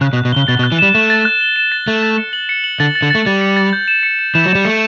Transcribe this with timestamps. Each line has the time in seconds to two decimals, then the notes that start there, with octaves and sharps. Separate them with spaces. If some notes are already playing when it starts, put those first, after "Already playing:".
0.01 C#3 F#6
0.13 B2
0.17 F#6
0.25 B2
0.32 C#3 G7
0.48 B2 A6
0.59 B2
0.64 F#6
0.72 E3
0.79 G3 E7
0.94 A3 E7
1.10 A6
1.25 F#6
1.41 G7
1.56 E7
1.72 A6
1.87 A3 A6
2.03 A6
2.18 C#7
2.33 F#7
2.49 C#7
2.64 F#7
2.80 D3 A6
2.95 A6
3.02 D3
3.10 A3 A6
3.26 G3 A6
3.41 C#7
3.56 A6
3.73 G6
3.88 E7
4.03 C#7
4.19 E7
4.34 E3 E7
4.46 F#3 E7
4.55 G3
4.65 A3 C#7